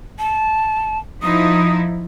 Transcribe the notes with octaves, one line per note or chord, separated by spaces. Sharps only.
A5
F3 D#4 E4 D#6